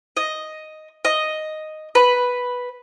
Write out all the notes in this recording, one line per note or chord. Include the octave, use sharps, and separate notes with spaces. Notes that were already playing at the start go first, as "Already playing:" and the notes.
D#5
D#5
B4